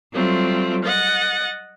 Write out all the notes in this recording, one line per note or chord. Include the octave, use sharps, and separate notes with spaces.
F#3 G3 A3 C4 F4
D#5 F#5 A6